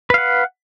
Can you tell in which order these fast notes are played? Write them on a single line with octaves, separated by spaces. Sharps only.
B4 F5 F#5